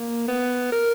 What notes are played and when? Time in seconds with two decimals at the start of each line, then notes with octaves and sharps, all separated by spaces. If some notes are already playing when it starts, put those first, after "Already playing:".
Already playing: A#3
0.28 B3
0.72 A#4